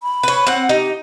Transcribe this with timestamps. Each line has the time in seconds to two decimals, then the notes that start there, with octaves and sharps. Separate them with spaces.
0.03 B5
0.23 B4 C#5
0.47 C4 F#5
0.69 D#4 G4